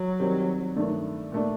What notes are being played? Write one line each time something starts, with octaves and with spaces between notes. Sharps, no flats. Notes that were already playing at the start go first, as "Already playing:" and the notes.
Already playing: F#3
D#3 G3 C4 D#4 G4
G2 D#3 A3 D4
A#2 A3 D4